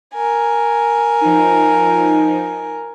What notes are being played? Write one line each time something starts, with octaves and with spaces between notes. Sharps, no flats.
A#4 G#5
F3 D#4